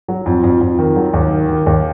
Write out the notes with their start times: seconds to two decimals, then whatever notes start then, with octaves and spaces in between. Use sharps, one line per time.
0.08 F#3
0.26 F2
0.44 F2
0.61 F2
0.79 D#3
0.96 F#3
1.13 D#2
1.31 D#3
1.49 D#3
1.66 D#2